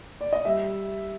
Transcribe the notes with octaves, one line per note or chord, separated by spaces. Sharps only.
D5
D#5
G3 E5